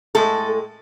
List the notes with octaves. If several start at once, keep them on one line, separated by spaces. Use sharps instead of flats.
A2 G#3 A4